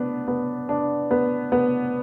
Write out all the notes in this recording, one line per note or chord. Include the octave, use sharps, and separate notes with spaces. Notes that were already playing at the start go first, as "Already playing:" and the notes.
Already playing: B3 D4
B3
D4
B3
B3